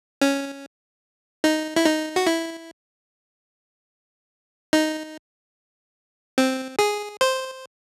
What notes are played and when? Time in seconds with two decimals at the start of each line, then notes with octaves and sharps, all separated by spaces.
0.21 C#4
1.44 D#4
1.76 E4
1.86 D#4
2.16 F#4
2.27 E4
4.73 D#4
6.38 C4
6.79 G#4
7.21 C5